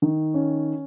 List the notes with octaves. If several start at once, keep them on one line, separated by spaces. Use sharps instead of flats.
D#3
C#4